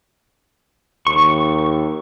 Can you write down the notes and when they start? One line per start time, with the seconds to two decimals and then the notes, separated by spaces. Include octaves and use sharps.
1.07 D#2 C#6